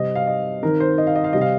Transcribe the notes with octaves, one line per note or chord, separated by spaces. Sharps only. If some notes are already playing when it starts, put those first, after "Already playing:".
Already playing: C3 G3 C4 D#5
F5
D#5
D#3 C4 A#4
C5
D#5
F5
D#5
F5
C3 G3 C4 D#5
F5